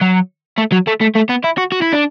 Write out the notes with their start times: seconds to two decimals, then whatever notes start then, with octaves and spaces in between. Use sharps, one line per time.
0.01 F#3
0.58 A3
0.72 F#3
0.87 A3
1.01 A3
1.15 A3
1.29 B3
1.44 E4
1.58 F#4
1.72 F#4
1.82 E4
1.93 D4